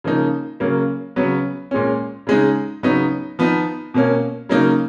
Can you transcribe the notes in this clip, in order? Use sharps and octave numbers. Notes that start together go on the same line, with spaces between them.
C#3 F3 A#3 D#4
C#3 F#3 A#3
C#3 F#3 B3
A#2 G#3 C#4
C#3 G#3 D#4
C#3 F#3 B3 D#4
F3 B3 D#4
B2 A#3 C#4
C#3 F#3 A#3 D#4